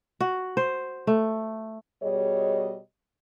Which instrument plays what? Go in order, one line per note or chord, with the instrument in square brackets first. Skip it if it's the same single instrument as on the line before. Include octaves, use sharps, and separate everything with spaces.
[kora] F#4
C5
A3
[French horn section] B2 G3 G#4 C#5 D#5